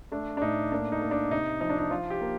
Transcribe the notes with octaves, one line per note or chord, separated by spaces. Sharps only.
A3 D4
D4
A2 D#4
A#3 D4
D#4
A#3
D4
C3 D#4
F3 D#4
D4
D#4
F3 F4
G4
A#3